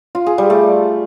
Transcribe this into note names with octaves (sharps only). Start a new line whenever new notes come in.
F4
G#4
G3
A3